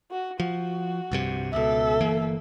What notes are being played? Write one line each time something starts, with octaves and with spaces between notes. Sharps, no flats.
F#4
F3 F#4
C2 G2 C3
C#2 B2 A4 E5
G1 E3 A#3